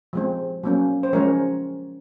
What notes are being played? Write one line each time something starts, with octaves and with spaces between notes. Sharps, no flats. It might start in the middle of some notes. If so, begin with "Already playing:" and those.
F3 G#3 C4
F#3 A#3 C#4
C5
F3 G#3 C#4 A#4 C#5